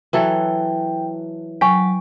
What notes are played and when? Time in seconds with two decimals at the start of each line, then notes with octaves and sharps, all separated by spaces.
0.13 E3 F#3 A4 G5
1.61 F#3 G5 G#5 C#6